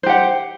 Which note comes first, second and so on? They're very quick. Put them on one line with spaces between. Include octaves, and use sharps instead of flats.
C5 G4 F#5